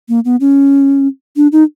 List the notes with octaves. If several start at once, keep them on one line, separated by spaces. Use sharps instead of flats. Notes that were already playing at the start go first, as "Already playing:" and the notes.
A#3
B3
C#4
D4
D#4